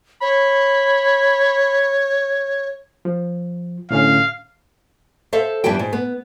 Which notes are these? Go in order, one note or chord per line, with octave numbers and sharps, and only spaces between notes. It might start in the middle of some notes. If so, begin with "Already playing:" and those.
C#5 B5
F3
A2 D3 C#4 F5
A4 C5 E5 F5
G2 E3 F3 B3 G4 G5
G#2
B3